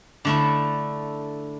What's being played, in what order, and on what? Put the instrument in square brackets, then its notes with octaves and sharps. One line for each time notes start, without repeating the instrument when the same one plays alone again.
[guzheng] D3 A3 E4